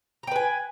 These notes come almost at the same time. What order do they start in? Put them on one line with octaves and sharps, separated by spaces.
A#5 G5 B4 G#5